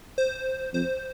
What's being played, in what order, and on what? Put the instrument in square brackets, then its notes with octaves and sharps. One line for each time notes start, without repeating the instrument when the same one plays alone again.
[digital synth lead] C5
[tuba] F2 [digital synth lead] C5